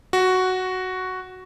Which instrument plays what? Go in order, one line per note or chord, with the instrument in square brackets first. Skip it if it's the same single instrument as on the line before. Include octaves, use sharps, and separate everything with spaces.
[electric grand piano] F#4